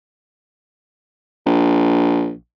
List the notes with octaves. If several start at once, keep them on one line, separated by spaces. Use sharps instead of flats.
A#1